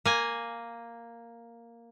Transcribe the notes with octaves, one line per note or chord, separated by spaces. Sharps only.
A#3 G#5